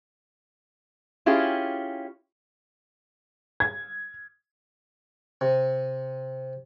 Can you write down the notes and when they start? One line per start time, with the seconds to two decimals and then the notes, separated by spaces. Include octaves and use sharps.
1.26 C#4 E4 F4 G4 G#4
3.60 G#6
5.41 C3